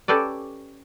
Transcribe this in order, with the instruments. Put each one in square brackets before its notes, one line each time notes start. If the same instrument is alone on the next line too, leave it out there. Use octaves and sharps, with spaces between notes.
[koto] C#4 G4 A4 B4 D5